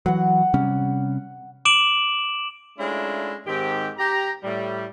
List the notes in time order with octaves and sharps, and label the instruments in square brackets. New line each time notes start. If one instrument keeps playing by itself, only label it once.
[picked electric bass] E3 F#3 [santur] F#5
[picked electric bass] C3 G3 C#4
[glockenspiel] D6 D7 E7 F#7
[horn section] G#3 A3 C#4 D4 E4 F4
G#2 D#3 C4 G4
G4 A#5
A2 G3